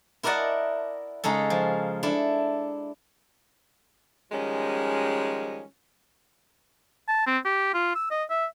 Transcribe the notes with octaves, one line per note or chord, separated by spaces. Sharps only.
E4 A#4 D5 D#5 F#5 A5
C#3 G#3 D#4 A4
F3
D4 E4 A4
D#3 F3 G3 G#3 C#4
A5
C4
G4
F4
E6
D#5
E5